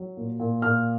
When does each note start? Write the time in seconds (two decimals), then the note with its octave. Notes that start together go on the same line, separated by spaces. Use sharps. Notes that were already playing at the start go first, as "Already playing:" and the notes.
Already playing: F#3
0.17 A#2
0.40 A#2
0.62 A#2 F6